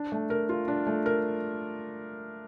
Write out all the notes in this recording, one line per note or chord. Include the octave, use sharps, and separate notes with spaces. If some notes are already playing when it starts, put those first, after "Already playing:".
Already playing: D4
A3
A#4
F4
D4
A3
A#4